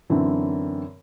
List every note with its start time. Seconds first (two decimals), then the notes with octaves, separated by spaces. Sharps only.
0.10 F#2 D3 E3 C4